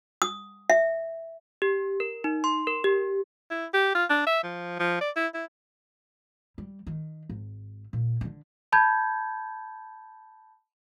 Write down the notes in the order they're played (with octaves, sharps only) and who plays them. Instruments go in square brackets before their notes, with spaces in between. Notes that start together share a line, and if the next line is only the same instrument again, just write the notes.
[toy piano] D#6
E5
[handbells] G4
A#4
D#4
C6
A#4
G4
[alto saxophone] E4
G4
F4
D4
E5
F3
F3
D5
E4
E4
[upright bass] G3
D#3
G#1
A#2
D3 D#3
[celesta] A5 B5 G6 G#6